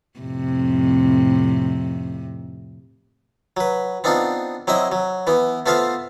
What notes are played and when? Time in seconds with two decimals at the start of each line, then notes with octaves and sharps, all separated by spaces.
0.20 F2 A2 C3
3.57 F#3 B4
4.04 B3 C4 D4 D#4 F4
4.67 F#3 C4 E4 D#5 E5
4.92 F#3
5.27 E3 B3
5.66 A3 B3 F4 C5 E5 F5